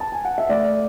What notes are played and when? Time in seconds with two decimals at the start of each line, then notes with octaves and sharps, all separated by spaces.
0.00 A5
0.12 G#5
0.25 F#5
0.38 E5
0.49 A3 D5